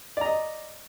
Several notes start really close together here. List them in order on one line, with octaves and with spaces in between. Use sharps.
D5 A#5 D#5